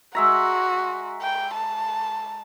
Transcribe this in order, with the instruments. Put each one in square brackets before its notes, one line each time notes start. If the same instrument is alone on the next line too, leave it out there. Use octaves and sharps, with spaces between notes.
[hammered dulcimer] G#3 E5 A#5 [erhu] F#4
[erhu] G5
A5